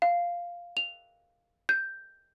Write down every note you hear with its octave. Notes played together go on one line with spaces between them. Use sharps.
F5
F7
G6